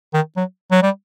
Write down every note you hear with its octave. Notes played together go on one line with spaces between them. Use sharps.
D#3
F#3
F#3
G3